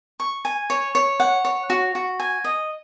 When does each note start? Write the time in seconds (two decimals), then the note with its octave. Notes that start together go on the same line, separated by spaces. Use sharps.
0.20 C#6
0.45 G#5
0.70 C#5
0.95 C#5
1.20 F#5
1.45 C#5
1.70 F#4
1.95 F#4
2.20 G#5
2.44 D#5